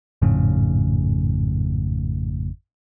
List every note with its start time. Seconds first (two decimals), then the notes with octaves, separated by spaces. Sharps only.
0.22 G#1 F2 A2 C#3